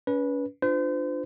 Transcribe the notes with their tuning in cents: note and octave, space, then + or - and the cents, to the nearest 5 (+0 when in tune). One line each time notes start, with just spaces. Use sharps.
C#4 +35 B4 -20
D4 +15 F4 +0 C5 -40